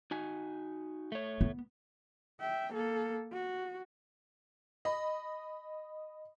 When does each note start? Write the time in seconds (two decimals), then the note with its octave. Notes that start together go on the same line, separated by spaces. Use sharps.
0.11 D#4 F#4 G#5
1.12 A3 C#5
1.41 B3
2.41 E5 G5
2.73 A#3 A4
3.33 F#4
4.85 D#5 B5